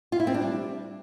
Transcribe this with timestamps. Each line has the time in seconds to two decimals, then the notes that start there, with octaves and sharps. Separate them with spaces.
0.12 F4
0.20 E4
0.27 C4
0.34 D4
0.42 G3